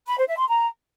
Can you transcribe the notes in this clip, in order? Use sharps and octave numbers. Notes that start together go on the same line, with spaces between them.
B5
C5
E5
C6
A#5